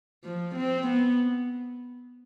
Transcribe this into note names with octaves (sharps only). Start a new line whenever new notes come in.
F3
C4
B3